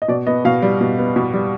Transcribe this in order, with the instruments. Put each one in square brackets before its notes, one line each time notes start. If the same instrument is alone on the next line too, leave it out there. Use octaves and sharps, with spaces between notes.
[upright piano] D#5
B2 D5
B3 D#5
B2 F5
G3
B2
B3
B2
G3